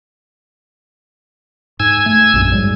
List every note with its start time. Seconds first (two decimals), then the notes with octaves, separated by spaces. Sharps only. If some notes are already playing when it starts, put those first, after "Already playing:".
1.80 G#2 G#5 E6 G#6
2.06 A3
2.34 A#1 F#2 G#3
2.52 G#2 F#3 G3